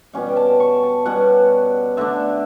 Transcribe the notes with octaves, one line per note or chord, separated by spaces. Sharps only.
B2 G3 C#4 F#5
G5
A5
C#6
A5
B2 G3 C#4 F#5
D3 A3 D4 E5